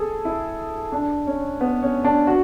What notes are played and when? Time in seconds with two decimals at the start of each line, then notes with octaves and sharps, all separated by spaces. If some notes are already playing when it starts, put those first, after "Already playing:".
Already playing: G#4 A4
0.25 E4
0.92 D4
1.27 C#4
1.61 B3
1.82 C#4
2.04 D4
2.27 F#4